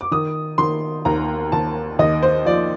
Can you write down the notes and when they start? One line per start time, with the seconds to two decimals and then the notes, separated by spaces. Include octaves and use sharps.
0.01 D6
0.11 D#3 D#6
0.58 D#3 C6
1.05 D#2 A#5
1.52 D#2 A5
1.99 D#2 D#5
2.23 C5
2.46 F3 D5